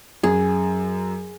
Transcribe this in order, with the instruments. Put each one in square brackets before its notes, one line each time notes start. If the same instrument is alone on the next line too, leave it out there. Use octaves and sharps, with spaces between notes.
[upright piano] F#2 [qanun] G#4